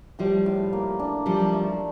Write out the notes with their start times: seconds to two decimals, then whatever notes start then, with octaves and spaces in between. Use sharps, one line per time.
0.19 A2 F3 G3
0.46 A2
0.73 A#3
1.00 D4
1.26 F3 G3 D4
1.53 A3